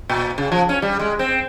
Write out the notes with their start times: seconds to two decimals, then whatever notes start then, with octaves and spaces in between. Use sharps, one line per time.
0.09 A#2
0.38 C#3
0.52 F3
0.69 C#4
0.82 G3
1.00 G#3
1.19 C4